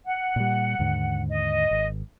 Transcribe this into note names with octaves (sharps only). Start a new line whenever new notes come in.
F#5
A#2 G3
D#2 G#2 D3
D#5
G#1